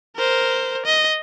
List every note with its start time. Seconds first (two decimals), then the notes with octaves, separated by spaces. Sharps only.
0.16 A#4 C5
0.86 D#5